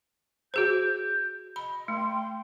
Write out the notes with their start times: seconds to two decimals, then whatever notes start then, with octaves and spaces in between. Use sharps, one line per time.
0.54 F#4 G#4 C5 G6
1.56 D#5 B5
1.88 A3 G5 C6